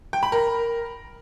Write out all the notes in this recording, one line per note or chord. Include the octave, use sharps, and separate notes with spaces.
G5
B5
A#4